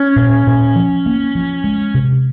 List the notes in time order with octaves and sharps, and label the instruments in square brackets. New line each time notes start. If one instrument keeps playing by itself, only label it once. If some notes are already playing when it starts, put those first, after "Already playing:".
Already playing: [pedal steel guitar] C#4
[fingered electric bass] A#2
A#2
F3
A#3
F3
G#3
C3